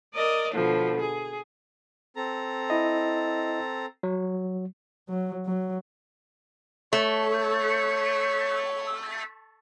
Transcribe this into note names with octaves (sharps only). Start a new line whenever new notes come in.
A#4 D5 D#5
B2 D3 F3
G#4
C4 A4 A#5
E4 D#5
F#3
F#3
F#3
A3 C#5